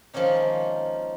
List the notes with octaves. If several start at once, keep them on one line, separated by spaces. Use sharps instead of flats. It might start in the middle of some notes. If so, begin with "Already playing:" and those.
D#3 F3 G#3 A#3 C#4 D#4